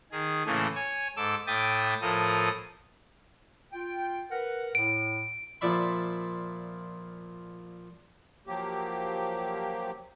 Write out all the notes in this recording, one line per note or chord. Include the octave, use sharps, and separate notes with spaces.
D#3 G#4
A2 C#3 E3 A3 A#3
C#5 G#5
G#2 A4 D6 E6
A2 E5 G5 D6 D#6 A6
A2 F3 A4 A#4 D#6
F4 G5
A#4 B4 F#5
A2 D7
A#2 F3 D5 E5 B5
F3 F#3 A#3 G4